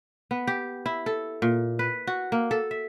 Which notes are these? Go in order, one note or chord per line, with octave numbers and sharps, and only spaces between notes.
B3
G4
E4
A4
A#2
B4
F#4
A#3
A4
E5